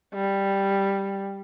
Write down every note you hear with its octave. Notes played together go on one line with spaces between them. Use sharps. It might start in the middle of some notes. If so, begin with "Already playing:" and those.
G3